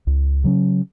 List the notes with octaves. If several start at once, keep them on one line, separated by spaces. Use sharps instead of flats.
C#2
C#3 F#3 C#4